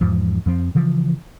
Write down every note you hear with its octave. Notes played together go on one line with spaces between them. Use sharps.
E2 G#2 F3
F2 F3 C4
C#3 E3 F3